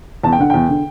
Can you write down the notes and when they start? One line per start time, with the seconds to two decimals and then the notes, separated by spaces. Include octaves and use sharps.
0.24 E2 A5
0.32 G5
0.39 D3 F#5
0.50 E2 G5
0.69 D3